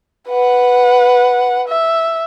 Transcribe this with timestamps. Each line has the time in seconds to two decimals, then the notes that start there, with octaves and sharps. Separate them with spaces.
0.29 B4 F#5
1.68 E5